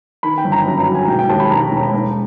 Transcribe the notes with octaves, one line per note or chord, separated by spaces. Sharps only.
D#3 B5
G5
G1
A#5
F#2
A#5
F#3
G#5
E1 G5
G5
D#2 A5
B5
E1 A#5
E1
E1